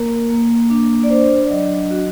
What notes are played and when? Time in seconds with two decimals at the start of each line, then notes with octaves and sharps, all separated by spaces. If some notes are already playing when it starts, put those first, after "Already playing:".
Already playing: A#3 A#4
0.30 A#3
0.70 D4
1.03 D5
1.10 D4 C5
1.44 D5
1.50 F#3 D#5
1.91 F#4